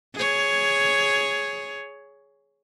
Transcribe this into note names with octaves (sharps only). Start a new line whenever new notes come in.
G#4 C#5